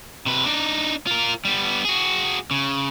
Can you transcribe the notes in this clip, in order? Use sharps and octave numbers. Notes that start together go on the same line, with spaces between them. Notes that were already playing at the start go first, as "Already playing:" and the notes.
C3 B4
D4 D#4
F4 A#4
G3 B3
F#4 G#4
C#3